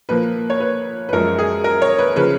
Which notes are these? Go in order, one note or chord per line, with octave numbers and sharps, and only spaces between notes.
A#2 F3 A#3 B4
C#5
B4
B4
F#2 F3 G#3 A#4
G#4
A#4
C#5
B4
C#3 F3 B4